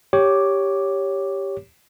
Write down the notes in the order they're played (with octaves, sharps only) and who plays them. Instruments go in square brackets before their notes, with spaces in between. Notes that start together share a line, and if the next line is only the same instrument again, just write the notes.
[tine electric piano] G4 C#5 D6